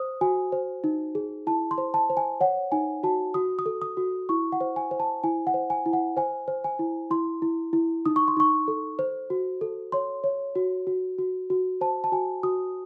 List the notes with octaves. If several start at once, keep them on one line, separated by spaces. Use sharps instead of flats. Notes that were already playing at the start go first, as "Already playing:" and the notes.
Already playing: C5 D#6
F#4 G#5
C5
D#4
G#4
E4 A5
C6
C5
A5
C5
G#5
C#5 F#5
D#4 G#5
F#4 A5
F#4 D#6
D#6
A4
D#6
F#4
E4 C#6
F#5
C5
G#5
C5
A5
E4 G#5
F#5
C5
G#5
E4
F#5
C5 G#5
C5
G#5
E4
E4 C6
E4
E4
D#4 D#6
C#6
C6
D#4 C#6
A4
C5
F#4
A4
C#5 C6
C#5
F#4
F#4
F#4
F#4
C5 A5
A5
F#4 G#5
F#4 D#6